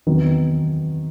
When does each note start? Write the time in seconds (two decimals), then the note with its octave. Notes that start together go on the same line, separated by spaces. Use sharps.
0.06 E2 C3 D#3 F#3 B3